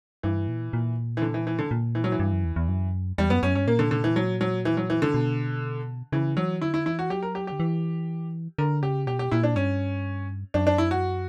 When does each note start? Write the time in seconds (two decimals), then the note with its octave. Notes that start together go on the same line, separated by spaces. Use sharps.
0.23 G2 E3
0.48 A#2
0.73 A#2
1.17 E3
1.22 D3
1.34 E3
1.47 E3
1.59 D3
1.71 A#2
1.95 E3
2.04 F#3
2.12 E3
2.20 G2
2.33 F#2
2.45 E2
2.56 E2
2.68 F#2
3.18 E2 G3
3.30 F#2 B3
3.43 F#2 C#4
3.55 G2 C#4
3.67 A#2 A#3
3.79 D3
3.91 D3
4.04 E3
4.16 F#3
4.41 F#3
4.65 E3
4.77 F#3
4.90 E3
5.02 D3
5.14 B2
6.12 C#3 E3
6.37 E3 F#3
6.62 D3 E4
6.74 E4
6.86 E3 E4
6.99 F#4
7.10 F#3 G4
7.23 A#4
7.35 G4
7.47 D3 G4
7.60 E3
8.58 D3 A#4
8.82 C#3 G4
9.07 B2 G4
9.19 G4
9.31 A#2 E4
9.43 D4
9.56 G2 C#4
10.54 F#2 D4
10.67 D4
10.78 E4
10.91 F#4